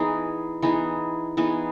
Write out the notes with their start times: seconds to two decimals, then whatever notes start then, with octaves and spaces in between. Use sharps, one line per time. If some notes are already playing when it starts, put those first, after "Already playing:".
Already playing: E3 B3 D#4 G#4
0.62 E3 B3 D#4 G#4
1.37 E3 B3 D#4 G#4